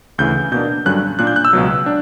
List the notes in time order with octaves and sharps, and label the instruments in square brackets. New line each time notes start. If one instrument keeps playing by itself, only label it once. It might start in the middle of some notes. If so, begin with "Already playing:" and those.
[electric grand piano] D2 C#3 E3 G6
B2 A#3 D4 G6
G2 D3 F#3 C#4 F#6
A#2 A#3 D4 F#6
G6
F#6
E6
C#2 B2 F#3
D4